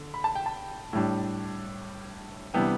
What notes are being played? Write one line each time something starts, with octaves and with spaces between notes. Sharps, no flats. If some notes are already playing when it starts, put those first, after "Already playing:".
Already playing: D3
B5
A5
G5
A5
A2 G3 D4
C3 E3 G3 B3 D4 G5